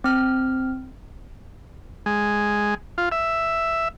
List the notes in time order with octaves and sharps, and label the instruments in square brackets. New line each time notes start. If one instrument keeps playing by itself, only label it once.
[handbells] C4 F6
[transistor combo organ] G#3
F4
E5